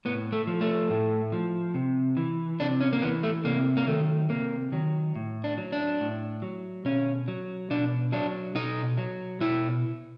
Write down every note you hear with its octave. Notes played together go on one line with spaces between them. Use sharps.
A2 B3
A3
F3
A3
A2
F3
C3
E3
C3 D4
C#4
A#3
E3 B3
A3
C3 A#3
A#3
D#3 F#3 A3
C3 A#3
D#3 F#3
A2
D4
F#3
D4
A2
F#3
B2 C#4
F#3
B2 D4
F#3 D4
B2 D#4
F#3
B2 E4